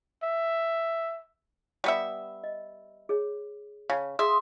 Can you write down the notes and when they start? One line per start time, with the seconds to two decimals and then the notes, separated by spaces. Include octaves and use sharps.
0.23 E5
1.84 G3 B3 E5
2.44 D#5
3.09 G#4 C#5
3.90 C#3 F5 A5
4.19 G#4 E5 A5 C6 D#6 E6